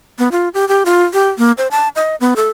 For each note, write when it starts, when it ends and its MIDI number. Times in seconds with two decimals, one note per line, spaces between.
0.19 0.28 59
0.32 0.49 65
0.54 0.67 67
0.68 0.83 67
0.85 1.04 65
1.13 1.28 67
1.38 1.52 58
1.58 1.68 72
1.71 1.89 81
1.96 2.16 75
2.20 2.34 59
2.36 2.49 69